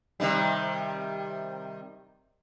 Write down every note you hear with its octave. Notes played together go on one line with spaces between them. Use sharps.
C3 D#3 G3